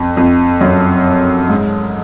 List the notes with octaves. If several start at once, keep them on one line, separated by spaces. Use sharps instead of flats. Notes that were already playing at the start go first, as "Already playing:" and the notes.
Already playing: F2
F2
F#2
G#2